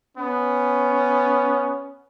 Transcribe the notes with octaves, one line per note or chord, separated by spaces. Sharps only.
B3 C#4